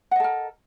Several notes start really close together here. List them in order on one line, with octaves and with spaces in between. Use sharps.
F#5 D#5 A4 A#4